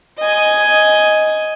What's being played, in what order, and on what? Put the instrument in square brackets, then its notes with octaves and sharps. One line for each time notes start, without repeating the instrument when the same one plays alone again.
[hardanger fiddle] D#5 G#5